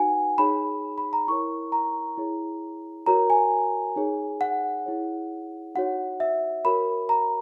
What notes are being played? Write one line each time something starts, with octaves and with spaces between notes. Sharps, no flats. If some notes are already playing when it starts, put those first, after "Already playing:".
Already playing: D#4 F#4 B4 F#5 G#5
D#4 G#4 C#5 B5
B5
A#5
E4 A#4 C#5 C#6
A#5
E4 G#4 C#5
F#4 A#4 C#5 A#5
G#5
D#4 G#4 C#5
F#5
E4 G#4 C#5
D#4 F#4 C#5 F#5
E5
F#4 A#4 C#5 B5
A#5